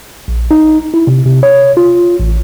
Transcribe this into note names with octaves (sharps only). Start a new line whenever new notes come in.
A#1
D#4
E4
C3
C3
C#5
F4
A1